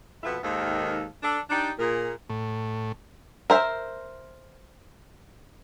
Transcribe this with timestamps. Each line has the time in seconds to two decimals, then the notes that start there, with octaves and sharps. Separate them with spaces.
0.24 F2 B2 B3 F4 E5
0.43 D#2 G#2 D#3 A4 C5 F5
1.23 D4 A4
1.50 D4 D#4 G4 D5
1.79 A#2 G#4 A#4
2.29 A2
3.50 A#4 C5 E5